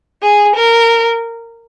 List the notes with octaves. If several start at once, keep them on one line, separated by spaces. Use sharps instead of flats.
G#4
A#4